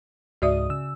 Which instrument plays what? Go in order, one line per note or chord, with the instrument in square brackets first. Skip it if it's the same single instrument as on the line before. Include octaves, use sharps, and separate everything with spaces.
[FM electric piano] C#2 G#2 D#6 [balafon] F#4 D5 E5
[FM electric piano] C#3 E6